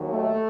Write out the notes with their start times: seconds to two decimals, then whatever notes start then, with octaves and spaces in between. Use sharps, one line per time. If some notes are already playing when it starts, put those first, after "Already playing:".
Already playing: D#2 D#3 F#3
0.08 A3